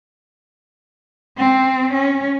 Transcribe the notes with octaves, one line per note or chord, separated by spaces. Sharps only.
C4
C#4